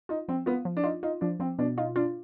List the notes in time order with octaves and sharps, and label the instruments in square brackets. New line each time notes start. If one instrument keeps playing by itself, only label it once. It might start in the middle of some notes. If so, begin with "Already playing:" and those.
[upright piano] D#4 [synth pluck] F4
[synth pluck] F3 [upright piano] C4
[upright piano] B3 [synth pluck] F4
[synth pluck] F3
[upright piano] D4
[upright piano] D#4 [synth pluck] F4
[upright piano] D#4 [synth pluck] F4
[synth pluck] F3 [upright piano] D4
[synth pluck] F3 [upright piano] C4
[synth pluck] B2 [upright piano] D4
[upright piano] D#4 [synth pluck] F4
[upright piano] D4 [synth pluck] F4